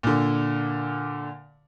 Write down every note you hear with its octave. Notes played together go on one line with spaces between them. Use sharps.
A#2 D3